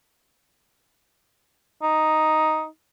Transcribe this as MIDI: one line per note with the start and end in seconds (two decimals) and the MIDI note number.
1.82 2.66 63